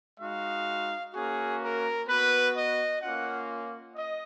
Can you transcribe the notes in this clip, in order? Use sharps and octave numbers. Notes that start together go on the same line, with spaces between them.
G#3 D#4 F#4 F5
A#3 C#4 F#4 G#4
A#4
B3 F#4 B4
D#5
A#3 C#4 F4 F#5
D#5